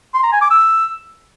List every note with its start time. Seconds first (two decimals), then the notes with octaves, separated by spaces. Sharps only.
0.14 C6
0.23 A#5
0.32 G#5
0.41 D6
0.50 E6